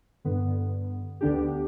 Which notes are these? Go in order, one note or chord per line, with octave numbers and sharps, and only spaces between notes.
G2 D3 B3
D2 D3 B3 D4 G4